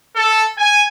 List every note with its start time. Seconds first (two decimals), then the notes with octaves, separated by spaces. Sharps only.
0.16 A4
0.58 G#5